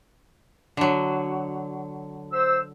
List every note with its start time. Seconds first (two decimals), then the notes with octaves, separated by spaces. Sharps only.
0.77 D3 F#3
2.33 C5 E6